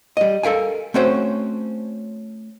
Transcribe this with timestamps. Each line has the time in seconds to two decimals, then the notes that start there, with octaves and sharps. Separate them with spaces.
0.17 G3 D#5
0.43 A4 A#4 F5 G#5
0.94 A3 C4 C#4 F#4 C5